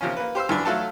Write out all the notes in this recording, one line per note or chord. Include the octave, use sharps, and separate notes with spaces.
C3 F3 A#3 C#4
A#3 B4
G4 C5 F5 E6
F#2 E3 D4
F#3 A3 F4 F#4 A4 A5